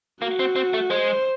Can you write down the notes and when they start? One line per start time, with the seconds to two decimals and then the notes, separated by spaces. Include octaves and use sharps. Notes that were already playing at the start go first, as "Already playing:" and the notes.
0.22 A#3 F#4
0.39 C4
0.56 C4
0.73 A3
0.90 G#3 C5